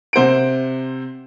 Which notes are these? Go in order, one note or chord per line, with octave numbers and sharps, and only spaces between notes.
C3 C5 F#5 D7